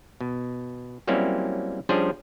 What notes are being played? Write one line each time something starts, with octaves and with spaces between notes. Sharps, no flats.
B2
F#3 G3 A#3 C4 C#4 E4
F3 G3 C#4 D4 G#4 C5